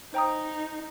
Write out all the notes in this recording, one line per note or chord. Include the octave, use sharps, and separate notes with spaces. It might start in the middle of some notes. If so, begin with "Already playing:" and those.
D#4 C5 G5 A#5 D#6